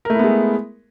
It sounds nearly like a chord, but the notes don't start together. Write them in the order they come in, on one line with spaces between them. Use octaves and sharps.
A#4 A3 E4 B3 G#3